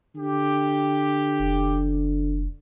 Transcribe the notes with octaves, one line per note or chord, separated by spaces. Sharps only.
D3 G4
F1